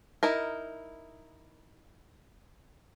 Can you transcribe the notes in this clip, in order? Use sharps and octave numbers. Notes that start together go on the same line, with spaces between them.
D#4 E4 A#4